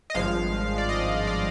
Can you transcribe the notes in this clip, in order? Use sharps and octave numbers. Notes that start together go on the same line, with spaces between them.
D#5
G#1 G2 F3 G#3 F5
D5
D#5
D5